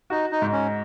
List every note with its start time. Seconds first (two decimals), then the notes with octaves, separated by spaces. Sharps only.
0.10 D#4 F#4
0.32 D#4
0.42 G#2
0.53 C#4